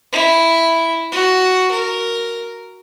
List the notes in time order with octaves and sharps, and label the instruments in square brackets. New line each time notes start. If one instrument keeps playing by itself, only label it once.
[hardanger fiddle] E4
F#4
A#4